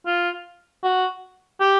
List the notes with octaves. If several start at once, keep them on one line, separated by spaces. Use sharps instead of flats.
F4
F#4
G4